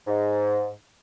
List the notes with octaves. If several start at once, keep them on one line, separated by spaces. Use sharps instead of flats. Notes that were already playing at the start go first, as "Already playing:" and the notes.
G#2